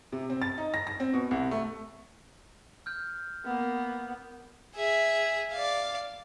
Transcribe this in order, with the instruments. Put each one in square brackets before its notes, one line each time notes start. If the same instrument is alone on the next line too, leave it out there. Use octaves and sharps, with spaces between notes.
[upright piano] C3
C4
A6
D#4
A#6
A#6
C4
B2
C2
A3
[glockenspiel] F6 G6
[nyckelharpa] A#3 [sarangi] B3
[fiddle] G#4 E5
D5 F5